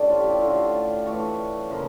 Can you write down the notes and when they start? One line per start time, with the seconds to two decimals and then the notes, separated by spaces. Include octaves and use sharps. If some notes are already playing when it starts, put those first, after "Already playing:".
Already playing: A2 G3 C#4 D4
0.10 F4
0.20 G4
0.30 E4
0.41 D3 A3 D4 F4
1.06 E3 A3 D4 C#5
1.70 C#3 F3 A#3 C#4 E5